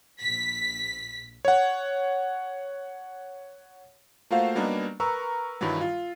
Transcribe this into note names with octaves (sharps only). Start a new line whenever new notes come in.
A#1 B6
C#5 F#5
A3 A#3 F4 F#4 C5 F5
F#3 G3 A#3 B3 D4 D#4
A#4 B4 A#5 C#6 E6
G2 D#3 E3 F#3 G3
F4